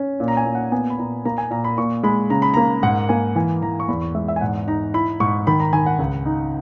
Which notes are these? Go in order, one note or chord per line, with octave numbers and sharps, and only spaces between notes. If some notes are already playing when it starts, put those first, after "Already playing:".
Already playing: C#4
A#2
A#5
G#5
A#2
F#5
B3 G#5
B5
A#2 A#5
A#3 A#5
G#5
A#2 A#5
B5
A#2 C#6
G#3 B5
C#3 A#5
B5
A#3 A#5
G#2 F#5
A#3 G#5
E3 G#5
E3 A#5
C#6
E2 B5
C#6
G#3 E5
E5
G#5
G#2 F#5
D#4 A#5
E4 B5
G#2 C#6
D#3 B5
A#5
D#3 G#5
F#5
C#2
D#4